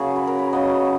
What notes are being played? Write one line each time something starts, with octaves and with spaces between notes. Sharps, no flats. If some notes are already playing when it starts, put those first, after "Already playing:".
Already playing: C#3 F#3 A#3 F#4 G#4
B4
A#4
B4
C#3 F#3 B3 D#5